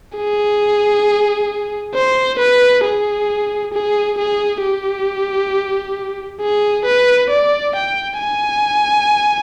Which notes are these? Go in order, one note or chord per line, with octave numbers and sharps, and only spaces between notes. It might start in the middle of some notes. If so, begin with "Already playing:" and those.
G#4
C5
B4
G#4
G#4
G#4
G4
G#4
B4
D5
G5
G#5